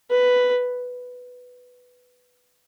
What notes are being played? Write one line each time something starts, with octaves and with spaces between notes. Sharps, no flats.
B4